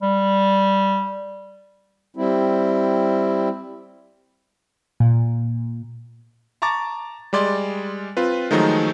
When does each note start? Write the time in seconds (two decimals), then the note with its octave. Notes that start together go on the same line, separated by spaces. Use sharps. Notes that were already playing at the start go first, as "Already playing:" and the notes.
0.02 G3
2.17 G3 C4 E4
5.00 A#2
6.62 A5 A#5 C#6 D6 A6
7.33 G3 G#3 D5 C6 A6
8.17 C4 F4 B4
8.51 D#3 F3 F#3 G#3 A3 D#4